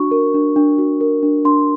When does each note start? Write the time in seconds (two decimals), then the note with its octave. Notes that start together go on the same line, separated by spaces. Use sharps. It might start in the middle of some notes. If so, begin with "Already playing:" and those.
Already playing: D4 F#4 C#6
0.11 A#4
0.34 D4
0.56 D4
0.78 F#4
1.01 A#4
1.23 D4
1.45 D4 C6